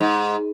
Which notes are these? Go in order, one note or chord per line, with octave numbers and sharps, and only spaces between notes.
G#2